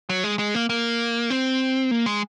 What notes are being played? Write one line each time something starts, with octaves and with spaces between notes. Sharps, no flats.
F#3
G#3
G#3
A#3
A#3
C4
A#3
G#3